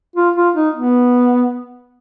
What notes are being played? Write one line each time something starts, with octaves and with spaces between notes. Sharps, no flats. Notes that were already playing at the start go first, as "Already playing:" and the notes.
F4
F4
D#4
B3